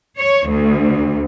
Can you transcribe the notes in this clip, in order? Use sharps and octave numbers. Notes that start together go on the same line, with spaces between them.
C#5
D2